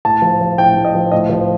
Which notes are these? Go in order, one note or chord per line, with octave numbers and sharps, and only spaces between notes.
A2 A5
F3
F3
A2 G5
A2
D#5
F3
A2 D#5
F3